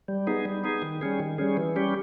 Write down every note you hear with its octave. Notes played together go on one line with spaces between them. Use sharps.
G3
B3 D#4 G#4
G3
B3 D#4 G#4
D#3
G3 C#4 G#4
D#3
G3 C#4 G#4
E3
G3 C#4 G4